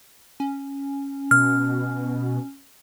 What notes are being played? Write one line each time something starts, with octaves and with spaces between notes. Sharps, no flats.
C#4
B2 F6